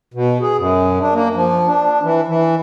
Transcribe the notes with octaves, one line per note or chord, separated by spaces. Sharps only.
B2
G#4
F#2
D4
A#3
F3
D4
E3
E3